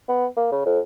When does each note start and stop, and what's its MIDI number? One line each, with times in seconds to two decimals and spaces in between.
0.08 0.26 59
0.36 0.47 58
0.52 0.64 49
0.65 0.79 41